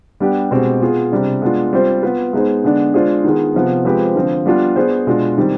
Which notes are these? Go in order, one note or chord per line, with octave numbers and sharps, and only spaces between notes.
G3 B3 D4 G4
B2 G#3 C4 G4
B3 F4 G#4
C3 G3 D4
G#3 B3 D4 F4
G3 C4 F4 C5
B3 F4 B4
G#3 B3 D#4 G#4 C5
D3 G#3 B3 D4
G#3 D4 F4 G#4 C5
D#3 B3 F4 G#4
C3 F3 B3
F3 G#3 C4 G4 B4
D3 F3 C4
G3 B3 D4 F4
B3 D4 G#4 C5
B2 G#3 D4 F4
D#3 G3 C4